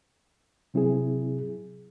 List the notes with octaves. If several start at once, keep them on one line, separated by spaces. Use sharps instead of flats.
C3 F#3 C4 E4 G#4